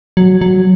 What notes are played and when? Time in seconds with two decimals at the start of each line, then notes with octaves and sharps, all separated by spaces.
0.17 F#3
0.41 F#3